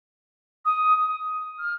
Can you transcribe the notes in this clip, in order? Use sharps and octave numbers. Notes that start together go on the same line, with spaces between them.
D#6
F6